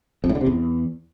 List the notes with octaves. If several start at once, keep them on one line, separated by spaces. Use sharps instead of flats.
F2
A2
D3
C3
E2